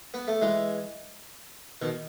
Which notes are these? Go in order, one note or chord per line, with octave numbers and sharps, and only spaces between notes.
B3
A3
E3 G#3
B2 D#3